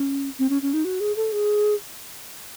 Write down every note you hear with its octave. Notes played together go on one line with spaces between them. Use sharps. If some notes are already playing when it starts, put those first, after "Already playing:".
Already playing: C#4
C4
C#4
C#4
D#4
F#4
G#4
A4
G#4